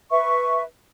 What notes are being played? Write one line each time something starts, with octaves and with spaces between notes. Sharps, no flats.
B4 E5 C#6